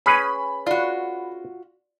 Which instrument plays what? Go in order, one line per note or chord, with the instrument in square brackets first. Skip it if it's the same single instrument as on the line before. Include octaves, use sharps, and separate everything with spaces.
[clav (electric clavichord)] C#4 G#4 B4 [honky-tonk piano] B5
[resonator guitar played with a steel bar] F4 F#4 [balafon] D5